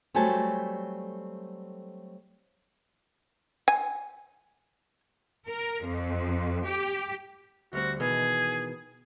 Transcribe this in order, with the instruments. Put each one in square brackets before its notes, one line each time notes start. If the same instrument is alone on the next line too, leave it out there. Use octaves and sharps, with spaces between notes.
[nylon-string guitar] F#3 G3 A3 C4 G#5 A5
[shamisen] G#5
[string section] A#4
F2
G4
[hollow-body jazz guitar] D2 G3 C4 [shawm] F#4
[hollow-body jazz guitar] B2 D#3 E3 [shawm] G#4